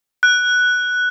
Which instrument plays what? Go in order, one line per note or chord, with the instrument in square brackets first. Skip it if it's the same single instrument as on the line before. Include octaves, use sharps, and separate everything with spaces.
[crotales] F#6